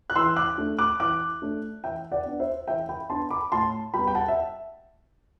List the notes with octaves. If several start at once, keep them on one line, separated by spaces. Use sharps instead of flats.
F#6
E3 C6 E6
D6 F#6
A3 D4
D6 F#6
E3 D6 F#6
A3 D4
E3 E5 G5
D5 F#5
B3 D4
C5 E5
E3 E5 G5
G5 B5
B3 D4 A5 C6
B5 D6
A2 A5 C6
G3 B3 G5 B5
G5
F#5 A5
E5